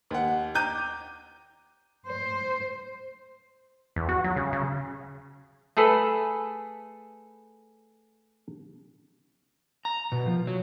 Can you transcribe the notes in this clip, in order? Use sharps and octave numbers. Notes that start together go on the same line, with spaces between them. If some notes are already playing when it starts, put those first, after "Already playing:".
D#2 F#5
G5 A#5 D6 G6 D#7
C5
E2
F#4
F#3
C#3
C#3
A3 G#4 A4 B4
A#5
B2
F3
F#3